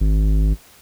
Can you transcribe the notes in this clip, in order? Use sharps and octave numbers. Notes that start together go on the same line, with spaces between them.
G#1